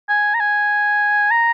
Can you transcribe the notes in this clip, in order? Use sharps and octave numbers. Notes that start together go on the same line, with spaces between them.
G#5
A#5
G#5
A#5